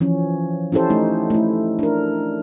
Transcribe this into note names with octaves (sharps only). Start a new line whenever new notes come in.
E3 F3 C#4
C#4 E4 G4 A4 C5
A3 D#4
A3 E4
D4 A#4